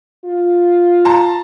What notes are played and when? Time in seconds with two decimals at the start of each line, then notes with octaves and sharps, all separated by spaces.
0.25 F4
1.05 A5 A#5 C6